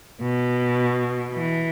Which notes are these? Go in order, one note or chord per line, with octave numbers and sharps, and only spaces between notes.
B2
E3